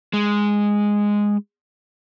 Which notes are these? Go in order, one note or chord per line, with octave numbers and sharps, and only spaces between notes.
G#3